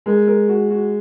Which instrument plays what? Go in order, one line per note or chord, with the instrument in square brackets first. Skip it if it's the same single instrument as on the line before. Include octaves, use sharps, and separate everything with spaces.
[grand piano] G#3 [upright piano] A#4
[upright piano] A#4
F#4
F#4